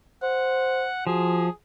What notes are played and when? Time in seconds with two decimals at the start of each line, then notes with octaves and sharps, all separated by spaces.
0.23 C5 F#5
1.07 F3 F#4 G#4